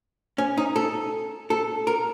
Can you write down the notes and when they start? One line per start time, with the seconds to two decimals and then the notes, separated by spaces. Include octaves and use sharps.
0.38 C#4
0.57 D#4
0.76 A4
1.50 A4
1.87 A#4